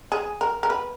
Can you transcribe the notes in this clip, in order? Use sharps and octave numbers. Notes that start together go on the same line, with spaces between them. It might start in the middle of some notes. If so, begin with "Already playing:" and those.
G#4
A#4
A#4
B4